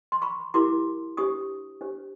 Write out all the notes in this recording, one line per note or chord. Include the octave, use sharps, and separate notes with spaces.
C6
B5 C#6
E4 G4 A#4 C6 D6
D4 G4 C5 C#6 D#6
D4 G4 C5